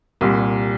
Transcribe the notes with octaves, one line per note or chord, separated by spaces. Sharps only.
C2 A#2 G3